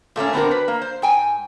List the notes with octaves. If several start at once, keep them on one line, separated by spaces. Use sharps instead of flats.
A#2 A3 A#3 C#4
D3 B3 C4 D4 F#4 A#4
B4
A#3
C5
G#2 G5 G#5